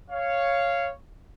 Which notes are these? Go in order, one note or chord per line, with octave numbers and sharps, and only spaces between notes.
C#5 F5